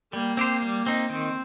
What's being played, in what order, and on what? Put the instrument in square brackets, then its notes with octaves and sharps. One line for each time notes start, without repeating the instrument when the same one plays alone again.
[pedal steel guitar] G3 [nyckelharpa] A#3
[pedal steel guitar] C4 G4 C5
G3
C4 D#4
[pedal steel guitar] D#3 [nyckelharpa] C4